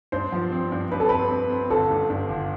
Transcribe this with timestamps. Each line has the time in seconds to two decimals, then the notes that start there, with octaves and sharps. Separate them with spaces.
0.12 G2 C5
0.32 F3
0.52 C4
0.72 G2
0.92 G2 B4
1.00 A4
1.09 C4 B4
1.30 C4
1.50 C4
1.70 G1 A4
1.90 G2
2.10 G2
2.29 G1